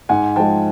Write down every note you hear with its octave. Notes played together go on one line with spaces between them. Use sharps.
G#2 F#5 G#5
F3 G#3 G5 A5